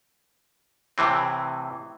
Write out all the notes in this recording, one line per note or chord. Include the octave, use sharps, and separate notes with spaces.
A2 C3 E3 C4